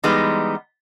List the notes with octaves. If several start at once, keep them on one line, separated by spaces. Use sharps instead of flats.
E3 G3 G#3 B3 D#4